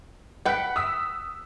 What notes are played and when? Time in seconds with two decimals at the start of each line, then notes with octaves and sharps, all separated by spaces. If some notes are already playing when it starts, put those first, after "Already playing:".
0.46 B4 F#5 G5 F#6 B6
0.76 D#6 E6 B6